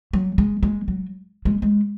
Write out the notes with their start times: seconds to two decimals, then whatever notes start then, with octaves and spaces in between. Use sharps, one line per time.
0.13 F#3
0.38 G#3
0.63 G#3
0.88 F#3
1.45 G#3
1.62 G#3